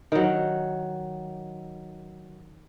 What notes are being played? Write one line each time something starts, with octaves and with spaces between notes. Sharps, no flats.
D#3 F#3